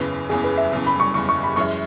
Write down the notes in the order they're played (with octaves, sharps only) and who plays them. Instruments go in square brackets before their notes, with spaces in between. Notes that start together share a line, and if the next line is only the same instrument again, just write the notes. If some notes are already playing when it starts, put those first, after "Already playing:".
Already playing: [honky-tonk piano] F#1 E2 C#3 [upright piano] B4
[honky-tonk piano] F#1 E2 C#3 [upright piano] G#4
[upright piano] B4
E5
[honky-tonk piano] F#1 E2 C#3
[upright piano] B5
C#6
[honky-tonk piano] F#1 E2 C#3 [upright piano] C#6
[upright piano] C#6
B5
[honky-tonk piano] F#2 E3 G#3 E4 [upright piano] C#6